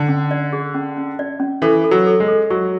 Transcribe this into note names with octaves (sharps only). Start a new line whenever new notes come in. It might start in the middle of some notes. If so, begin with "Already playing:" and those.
Already playing: D3
C#4
D5
G#4
C#4
C#4
D5
C#4
E3 A4
A4
F#3
A4
G#3
A4
F#3 C#6